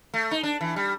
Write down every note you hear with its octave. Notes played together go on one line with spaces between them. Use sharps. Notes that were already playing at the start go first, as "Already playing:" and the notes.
A3
D#4
D4
E3
G3